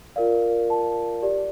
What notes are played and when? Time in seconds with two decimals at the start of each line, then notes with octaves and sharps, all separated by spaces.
0.16 F4 A#4 D5 F5
0.70 A5
1.22 G4 D5